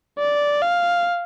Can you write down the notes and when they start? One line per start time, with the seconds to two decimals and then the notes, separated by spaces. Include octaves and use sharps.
0.19 D5
0.62 F5